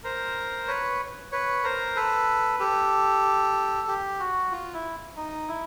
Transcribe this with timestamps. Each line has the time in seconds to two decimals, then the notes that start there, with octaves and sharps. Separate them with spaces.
0.04 A#4 C5
0.68 B4 C#5
1.32 B4 C#5
1.64 A#4 C5
1.96 A4 B4
2.60 G4 A4
3.88 G4
4.20 F#4
4.52 F4
4.74 E4
5.17 D#4
5.48 E4